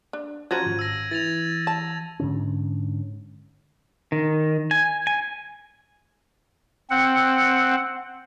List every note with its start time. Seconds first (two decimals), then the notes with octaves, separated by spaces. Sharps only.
0.13 D4
0.51 F3 C#4 F#4 C5 A5 A#5 G#6 D#7
0.66 G#1
0.79 E6 A#6
1.11 E3 A6 A#6 F7
1.67 A5
2.20 G#2 D3 C#4
4.12 D#3
4.71 G#5
5.07 G#5
6.90 C4 F#5